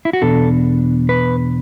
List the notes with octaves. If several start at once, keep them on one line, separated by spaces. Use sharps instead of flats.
E4
F#4
E2 B2 B3 D4 A4
B4